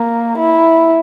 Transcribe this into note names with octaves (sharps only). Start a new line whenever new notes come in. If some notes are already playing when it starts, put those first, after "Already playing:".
Already playing: A#3
E4